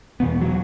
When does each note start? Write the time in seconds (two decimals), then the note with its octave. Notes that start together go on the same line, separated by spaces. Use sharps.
0.20 E2 B2 B3
0.41 F#3